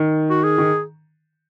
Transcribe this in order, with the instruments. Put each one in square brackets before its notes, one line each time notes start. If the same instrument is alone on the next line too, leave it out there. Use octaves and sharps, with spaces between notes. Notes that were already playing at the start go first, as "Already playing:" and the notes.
Already playing: [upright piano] D#3
[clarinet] F#4
G#4
[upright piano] D#3